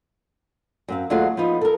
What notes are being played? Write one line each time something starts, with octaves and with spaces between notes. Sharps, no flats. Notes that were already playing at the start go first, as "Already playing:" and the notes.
F#2 C4 F5
D#2 F#3 A3 F4 G#4 F#5
F3 B3 D#4 F4
A4 A#4